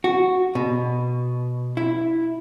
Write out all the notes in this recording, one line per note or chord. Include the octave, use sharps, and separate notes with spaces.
F#4
B2
E4